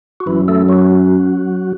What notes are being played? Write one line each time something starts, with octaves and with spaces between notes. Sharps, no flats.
F#4
F#2 E3 E4
A3 A4
F#3 F#4